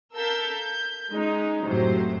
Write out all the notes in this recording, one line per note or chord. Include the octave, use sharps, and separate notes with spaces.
A4 A#4 F5 E6 G6 B6
G6
G#3 C#4 D#4
F#2 A2 C3 F#3 C5